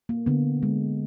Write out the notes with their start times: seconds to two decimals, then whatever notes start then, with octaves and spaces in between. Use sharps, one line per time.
0.09 A#3
0.26 D3 B3
0.63 G#3